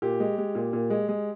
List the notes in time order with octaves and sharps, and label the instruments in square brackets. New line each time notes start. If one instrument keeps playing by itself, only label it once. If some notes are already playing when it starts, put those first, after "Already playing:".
[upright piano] A#2 G4
G#3
G#3
A#2
A#2
G#3
G#3